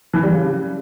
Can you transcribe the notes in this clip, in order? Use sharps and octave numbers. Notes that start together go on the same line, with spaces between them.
E3
G3
C#3